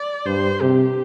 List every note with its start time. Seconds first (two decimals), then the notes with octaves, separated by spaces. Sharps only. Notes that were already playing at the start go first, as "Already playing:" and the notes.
Already playing: D5
0.26 G2 C5
0.61 C3 G4